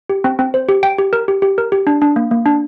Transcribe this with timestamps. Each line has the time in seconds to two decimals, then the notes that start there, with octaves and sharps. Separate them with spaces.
0.09 G4
0.24 C4
0.39 C4
0.54 C5
0.69 G4
0.83 G5
0.98 G4
1.13 A#4
1.28 G4
1.42 G4
1.58 A#4
1.72 G4
1.87 D4
2.02 D4
2.16 A#3
2.31 A#3
2.46 D4